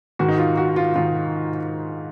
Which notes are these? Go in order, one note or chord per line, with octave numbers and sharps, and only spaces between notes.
G#2 D#3 F#4
D#4
F4
F#4
F4
G#2 D#3 F4